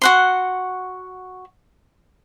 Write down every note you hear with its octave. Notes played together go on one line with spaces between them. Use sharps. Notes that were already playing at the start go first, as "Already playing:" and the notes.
F#4 F#5 C6